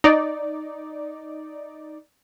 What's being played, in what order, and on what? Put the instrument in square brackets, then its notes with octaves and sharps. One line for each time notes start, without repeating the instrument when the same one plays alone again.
[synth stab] D#4 D5